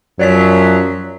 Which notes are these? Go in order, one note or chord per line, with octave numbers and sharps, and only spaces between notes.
F#2 F3 F#3 C#5 D5 B6